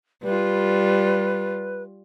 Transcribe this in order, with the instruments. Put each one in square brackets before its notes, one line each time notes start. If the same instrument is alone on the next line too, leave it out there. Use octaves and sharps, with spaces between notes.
[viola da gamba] G3 F4 [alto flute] B4